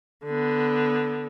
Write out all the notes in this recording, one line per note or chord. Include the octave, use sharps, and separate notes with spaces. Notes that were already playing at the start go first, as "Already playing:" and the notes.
D3 B3